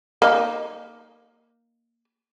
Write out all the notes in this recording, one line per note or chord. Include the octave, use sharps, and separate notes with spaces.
A#3 D#4